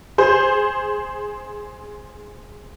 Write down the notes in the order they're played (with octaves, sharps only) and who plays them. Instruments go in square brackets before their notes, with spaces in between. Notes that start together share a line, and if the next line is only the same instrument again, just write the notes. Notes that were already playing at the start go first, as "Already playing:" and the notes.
[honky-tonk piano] G#4 C5